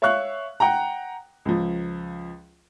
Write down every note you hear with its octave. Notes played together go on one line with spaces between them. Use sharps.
C#5 E5 F5 C#6 F#6
F#5 G5 A#5
C#2 F3